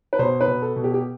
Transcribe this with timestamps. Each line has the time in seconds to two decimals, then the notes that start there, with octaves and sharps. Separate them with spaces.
0.13 B4
0.19 B2 C5
0.41 B4
0.48 B2
0.62 A4
0.76 B2
0.84 G4
0.94 G4